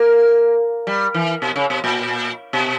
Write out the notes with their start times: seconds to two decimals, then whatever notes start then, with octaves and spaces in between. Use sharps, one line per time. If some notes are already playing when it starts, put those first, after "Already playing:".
Already playing: A#3
0.87 G3
1.14 E3
1.42 B2
1.56 C#3
1.70 B2
1.84 A#2
2.53 B2